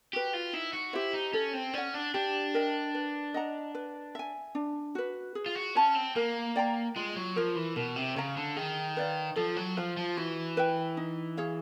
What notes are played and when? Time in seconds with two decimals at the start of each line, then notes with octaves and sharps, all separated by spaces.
0.13 F#4 G4 B4
0.33 F4
0.53 D#4 E4
0.73 F#4
0.93 E4 G4 C5
1.13 D#4
1.33 C#4 A4
1.53 C4
1.74 C#4 D5 F#5
1.94 D4
2.14 D4 G4
2.54 A#4 D#5 G5
2.94 B4
3.34 D#5 F#5 A#5
3.75 B4
4.15 E5 G#5
4.55 D4
4.95 F#4 B4
5.35 G#4
5.46 F4
5.55 F#4
5.75 C#4 C#5 F#5 A5
5.95 C4
6.15 A#3 A#4
6.56 D5 G5 A#5
6.96 G#3 F4
7.16 F#3
7.36 F3 A#4 C#5
7.56 E3
7.76 B2 A#4
7.96 C3
8.16 C#3 C#5 F5 A#5
8.36 D3
8.56 D#3 G#4
8.97 B4 D5 F5
9.36 F3 A4
9.56 F#3
9.77 F3 C5 F5
9.97 F3
10.17 E3 F#4
10.57 B4 E5 G5
10.97 D#4
11.37 G#4 C#5 F5